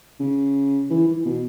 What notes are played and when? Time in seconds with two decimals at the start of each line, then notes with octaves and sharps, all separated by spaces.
0.20 C#3
0.90 E3
1.08 E3
1.25 B2